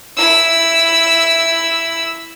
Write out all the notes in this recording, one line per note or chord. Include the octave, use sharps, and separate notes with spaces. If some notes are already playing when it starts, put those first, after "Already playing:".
E4 E6